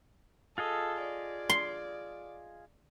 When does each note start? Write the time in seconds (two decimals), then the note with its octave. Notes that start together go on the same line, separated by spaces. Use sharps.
0.58 F4 G#4 A4 D#5
1.02 D5
1.50 C6